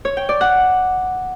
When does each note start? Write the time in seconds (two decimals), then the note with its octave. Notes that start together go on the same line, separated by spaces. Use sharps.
0.05 C#5
0.17 G5
0.29 D5
0.41 F#5